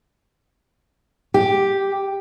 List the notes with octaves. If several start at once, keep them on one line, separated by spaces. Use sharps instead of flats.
G4